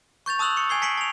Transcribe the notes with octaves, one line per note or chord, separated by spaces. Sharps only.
C#6 G6 A6 F7
A5 D#6 E6 F#6 F7 F#7
C#6 C#7
G#5 G#6 C7 G7
A5 B6 C#7 D7 F#7
A5 F7